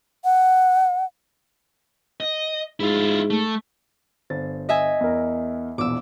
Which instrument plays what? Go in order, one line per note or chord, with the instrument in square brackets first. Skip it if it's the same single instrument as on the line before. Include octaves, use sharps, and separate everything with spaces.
[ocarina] F#5
[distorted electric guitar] D#5
[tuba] G#2 [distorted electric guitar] E4 F4
[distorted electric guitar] A3
[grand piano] G1 C5 A6
[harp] D#5 E5 G#5
[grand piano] E2 A#4
[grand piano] E1 A#1 E2 [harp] D6 E6